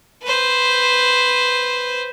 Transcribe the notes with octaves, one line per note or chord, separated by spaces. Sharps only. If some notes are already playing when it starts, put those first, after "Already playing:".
B4 C5